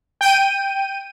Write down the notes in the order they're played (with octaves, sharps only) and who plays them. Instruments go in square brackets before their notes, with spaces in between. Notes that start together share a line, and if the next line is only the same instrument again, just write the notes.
[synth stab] G5 D#7